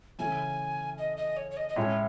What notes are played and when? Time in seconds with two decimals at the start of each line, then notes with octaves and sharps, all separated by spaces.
0.19 C#3 E3 A3 C#4 G#5
0.98 D#5
1.17 D#5
1.37 C#5
1.51 C#5
1.57 D#5
1.69 D#5
1.76 A2 G#3 C#4 E4 C#5